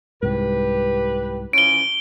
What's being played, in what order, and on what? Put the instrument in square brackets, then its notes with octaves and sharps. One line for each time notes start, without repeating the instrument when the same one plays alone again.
[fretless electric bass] C2 G#2 [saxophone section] G4 B4
[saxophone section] E3 F3 C#4 [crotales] D7 G7